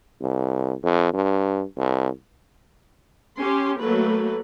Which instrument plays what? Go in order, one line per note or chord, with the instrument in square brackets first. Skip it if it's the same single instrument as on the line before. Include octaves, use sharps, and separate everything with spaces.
[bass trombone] C2
F2
G2
C2
[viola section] C#4 G4 C6
F#3 A3 A#3 B4